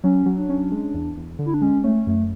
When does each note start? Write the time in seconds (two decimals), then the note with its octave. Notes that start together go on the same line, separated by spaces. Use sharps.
0.04 F#3 C#4
0.26 F#3
0.38 D4
0.49 C#4
0.72 G#3
0.94 E2
1.17 E2
1.39 D3
1.46 E4
1.54 D4
1.61 G#3 C#4
1.84 A3 C#4
2.07 F#2 A3